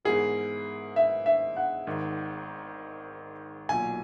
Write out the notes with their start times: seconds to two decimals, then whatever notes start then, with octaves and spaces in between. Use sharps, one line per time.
0.05 G#2 E3 B3 E4 G#4 A#4
0.96 E5
1.26 E5
1.57 F#5
1.87 G#1 G#2 D#3
3.69 B1 A#2 F#3 G#5